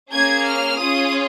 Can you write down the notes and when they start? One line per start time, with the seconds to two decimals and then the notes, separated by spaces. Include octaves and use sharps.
0.11 A#3 C#4 G#4 G#6
0.46 F6
0.79 C#4 F4 G#4 D#6